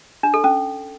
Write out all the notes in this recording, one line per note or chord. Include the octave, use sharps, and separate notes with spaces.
D4
A4
C#4